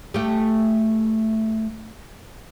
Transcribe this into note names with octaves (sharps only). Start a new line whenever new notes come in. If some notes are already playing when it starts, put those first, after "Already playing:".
A3 G4